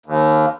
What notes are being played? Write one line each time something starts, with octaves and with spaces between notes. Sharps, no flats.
D#2